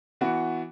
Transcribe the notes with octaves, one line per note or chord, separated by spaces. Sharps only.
E3 B3 F#4